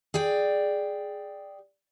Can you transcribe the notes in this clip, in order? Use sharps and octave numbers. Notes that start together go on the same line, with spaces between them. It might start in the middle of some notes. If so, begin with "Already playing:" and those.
G#4 D5 G5